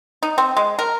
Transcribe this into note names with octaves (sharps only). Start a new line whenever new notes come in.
D#4
C4
G#3
A#4